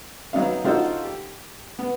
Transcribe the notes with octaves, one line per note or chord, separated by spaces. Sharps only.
F#3 B3 C4 D#4 F5
D3 D#4 F4 F#4 A4 C5
G4
B3